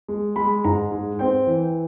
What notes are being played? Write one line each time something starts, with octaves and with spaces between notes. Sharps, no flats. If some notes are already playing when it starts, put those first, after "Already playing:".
G#3
G#3 B5
G#2 A#5
G#3
C4 G5
E3